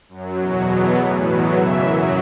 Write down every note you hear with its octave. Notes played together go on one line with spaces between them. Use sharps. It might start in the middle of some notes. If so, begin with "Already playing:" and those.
F#2 F#3
E2 B2 F#3
E2 B2 F#3 B3
A2 E3
E2 B2 F#3 B4
F#2 C#3 E3 E5
F#2 F#3